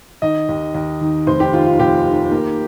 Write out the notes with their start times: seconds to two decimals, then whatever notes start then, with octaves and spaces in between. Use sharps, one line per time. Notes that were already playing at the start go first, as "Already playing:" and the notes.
0.22 D#3 D#5
0.48 D#2
0.74 D#2
1.01 D#3
1.27 F1 C5
1.40 G4
1.53 D#3 F4
1.66 F4
1.79 F1 G4
2.06 D#3
2.31 A#3